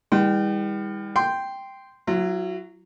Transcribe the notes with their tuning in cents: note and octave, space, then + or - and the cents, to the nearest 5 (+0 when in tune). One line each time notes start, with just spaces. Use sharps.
E3 -40 G3 +40 G5 -30
G5 +0 C6 -10
F#3 +0 E4 +40